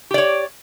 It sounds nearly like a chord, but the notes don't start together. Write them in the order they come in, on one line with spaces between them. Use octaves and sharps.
G4 D5 C#5